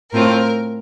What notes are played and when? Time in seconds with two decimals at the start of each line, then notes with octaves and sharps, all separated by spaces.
0.12 A2 A3 C4 F4 A#4